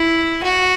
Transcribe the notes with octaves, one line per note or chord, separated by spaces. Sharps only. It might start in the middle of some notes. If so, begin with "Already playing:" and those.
Already playing: E4
F#4